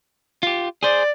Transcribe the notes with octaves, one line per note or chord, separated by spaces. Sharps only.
F4 G4
G#4 C5 D5